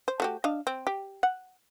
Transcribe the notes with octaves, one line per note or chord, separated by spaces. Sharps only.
C5
A3 F#4 G4
D4 D#5 F5
C4
G4
F#5